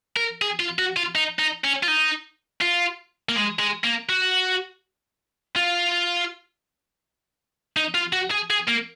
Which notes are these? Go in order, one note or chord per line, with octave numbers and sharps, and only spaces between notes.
A#4
G#4
F4
F#4
F4
D#4
D#4
C#4
F4
D#4
F4
A#3
G#3
G#3
A#3
F#4
F4
D#4
F4
F#4
G#4
G#4
A#3